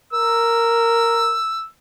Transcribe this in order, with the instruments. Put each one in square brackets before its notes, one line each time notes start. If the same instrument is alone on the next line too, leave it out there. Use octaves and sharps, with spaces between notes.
[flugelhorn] A#4 [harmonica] E6